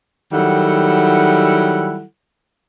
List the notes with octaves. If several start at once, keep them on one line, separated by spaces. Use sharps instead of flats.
D#3 F#3 G3 E4 A4 F#5